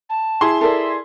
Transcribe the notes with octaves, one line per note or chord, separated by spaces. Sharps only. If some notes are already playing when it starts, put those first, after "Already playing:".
A5
E4 G#4 C6
A4 A#4 D5 E5